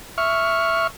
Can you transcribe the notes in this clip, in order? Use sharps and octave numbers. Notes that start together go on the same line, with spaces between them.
E5 C#6 F6